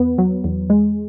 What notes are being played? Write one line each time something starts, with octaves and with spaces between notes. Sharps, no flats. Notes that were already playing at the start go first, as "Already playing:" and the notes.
Already playing: E2 B3
F#3
E2
G#3